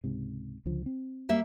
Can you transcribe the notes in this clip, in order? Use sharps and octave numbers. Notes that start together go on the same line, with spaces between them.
C#2 G#2 C3
C#2 D3 F3
C4
G3 A#3 E5